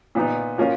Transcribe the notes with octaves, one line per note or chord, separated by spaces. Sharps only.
A#2 F3 B3 D#4
F3 A#3 C#4 F4